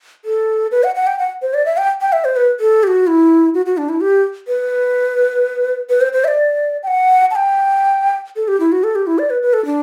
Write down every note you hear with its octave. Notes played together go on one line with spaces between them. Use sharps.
A4
B4
F#5
F#5
G5
F#5
C5
D5
E5
G5
G5
E5
C5
B4
A4
G4
F#4
E4
F#4
F#4
D4
E4
G4
B4
B4
C5
C5
E5
D5
G5
F#5
A5
G5
A4
G4
E4
F#4
A4
G4
E4
D5
B4
B4
A4
D4